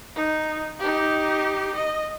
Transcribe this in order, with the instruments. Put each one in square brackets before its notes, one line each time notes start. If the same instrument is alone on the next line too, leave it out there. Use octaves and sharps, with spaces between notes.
[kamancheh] D#4
D#4 G4
D#5